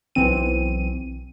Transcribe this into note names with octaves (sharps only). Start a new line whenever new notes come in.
B1 E3 C4 D#7